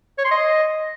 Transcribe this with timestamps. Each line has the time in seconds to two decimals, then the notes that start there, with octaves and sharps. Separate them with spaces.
0.18 C#5
0.25 C6
0.31 D#5